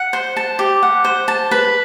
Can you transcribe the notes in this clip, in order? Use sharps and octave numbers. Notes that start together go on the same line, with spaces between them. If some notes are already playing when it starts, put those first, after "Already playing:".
Already playing: F#5
C5
A5
G4
F#5
C5
A5
B4